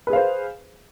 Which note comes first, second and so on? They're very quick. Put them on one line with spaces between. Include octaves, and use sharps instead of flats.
B4 G#4 F5 C5